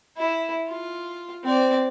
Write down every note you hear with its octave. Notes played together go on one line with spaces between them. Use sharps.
E4
F4
C4 D5